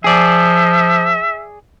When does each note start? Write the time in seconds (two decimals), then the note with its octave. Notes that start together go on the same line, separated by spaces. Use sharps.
0.04 F3 G#4 D5 E5